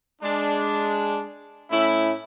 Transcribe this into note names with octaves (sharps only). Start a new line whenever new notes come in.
G#3 D4
A2 C#4 E4